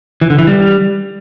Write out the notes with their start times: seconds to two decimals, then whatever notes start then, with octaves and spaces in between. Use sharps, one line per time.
0.21 E3
0.30 D3
0.39 E3
0.47 G3